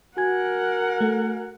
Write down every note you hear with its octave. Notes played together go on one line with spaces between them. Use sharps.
F#4 A#4 F#5 G#5 G#6
A3